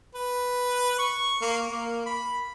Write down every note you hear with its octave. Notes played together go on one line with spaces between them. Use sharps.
B4
C#6
A#3
A#3
B5